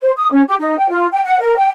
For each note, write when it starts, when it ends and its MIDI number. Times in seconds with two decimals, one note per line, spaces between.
0.02 0.11 72
0.16 0.31 87
0.32 0.42 61
0.47 0.55 67
0.59 0.78 63
0.78 0.89 79
0.90 1.07 65
1.12 1.21 79
1.24 1.38 78
1.41 1.55 70
1.57 1.69 79